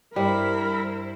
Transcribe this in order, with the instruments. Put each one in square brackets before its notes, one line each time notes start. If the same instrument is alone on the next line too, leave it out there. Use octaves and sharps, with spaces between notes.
[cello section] G2 E4 C5 [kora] G3 [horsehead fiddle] A#4 [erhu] B5